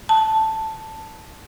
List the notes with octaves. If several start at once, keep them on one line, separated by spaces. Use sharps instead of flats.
A5